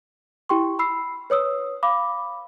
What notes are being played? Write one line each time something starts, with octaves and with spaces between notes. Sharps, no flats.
E4 G4 G5 C6 C#6
B5 E6 C7
B4 C#5 D#6 E6
F5 B5 D6